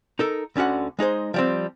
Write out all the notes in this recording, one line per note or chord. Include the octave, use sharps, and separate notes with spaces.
D#4 A4 A#4
D2 D3 C#4 F#4 F#5
G#3 D#4 G#4 C5
F3 G3 C4